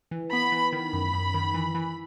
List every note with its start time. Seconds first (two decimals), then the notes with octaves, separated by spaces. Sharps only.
0.11 E3
0.32 B3 B5
0.52 E3
0.73 D#3 B5
0.93 F#2
1.13 F#2
1.34 D#3
1.54 E3
1.75 E3